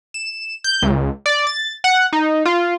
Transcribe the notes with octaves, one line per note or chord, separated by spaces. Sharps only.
E7
G6
C#2
D5
A6
F#5
D#4
F4